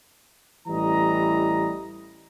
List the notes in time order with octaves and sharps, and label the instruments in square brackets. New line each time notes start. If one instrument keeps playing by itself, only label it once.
[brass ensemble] A1 E3 G3 D#5 A#5